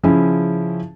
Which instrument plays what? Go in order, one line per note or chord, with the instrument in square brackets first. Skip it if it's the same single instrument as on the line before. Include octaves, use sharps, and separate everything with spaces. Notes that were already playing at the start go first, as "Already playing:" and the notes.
[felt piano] C#3 F3 C#4 E4 G#4